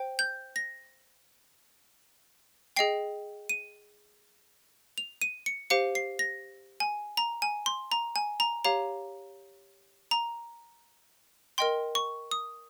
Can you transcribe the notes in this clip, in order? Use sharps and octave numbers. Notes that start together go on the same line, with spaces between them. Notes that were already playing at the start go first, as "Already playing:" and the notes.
Already playing: C5 G5
G6
A#6
G#4 D#5 G5 C7
D#7
F7
D#7
C#7
G4 C5 F5 C#7
C7
A#6
G#5
A#5
G#5
C6
A#5
G#5
A#5
G4 C#5 F5 A#5
A#5
A#4 D#5 G5 C6
C#6
D#6